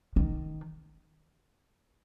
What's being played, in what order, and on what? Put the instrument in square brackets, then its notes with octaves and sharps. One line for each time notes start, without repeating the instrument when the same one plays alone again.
[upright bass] D#3